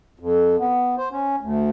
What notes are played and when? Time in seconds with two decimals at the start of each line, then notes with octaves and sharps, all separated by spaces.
0.19 F2
0.59 B3
0.98 C5
1.12 C#4
1.40 D2